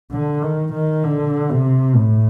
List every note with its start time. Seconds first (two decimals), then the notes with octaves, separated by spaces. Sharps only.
0.12 D3
0.43 D#3
0.73 D#3
1.04 D3
1.50 C3
1.95 A2